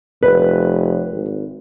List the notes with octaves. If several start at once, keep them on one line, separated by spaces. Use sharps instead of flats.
F1 B4
G#1